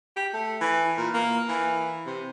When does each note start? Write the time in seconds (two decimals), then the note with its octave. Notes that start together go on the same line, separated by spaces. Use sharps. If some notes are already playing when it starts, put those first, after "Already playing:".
0.17 G4
0.33 A3
0.61 E3
0.97 A#2
1.14 A#3
1.49 E3
2.06 C3